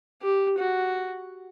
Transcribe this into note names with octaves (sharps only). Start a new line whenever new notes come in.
G4
F#4